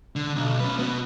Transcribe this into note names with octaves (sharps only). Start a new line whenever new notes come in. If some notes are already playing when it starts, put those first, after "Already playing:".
D3
B1
C#4 B4
B3 F#4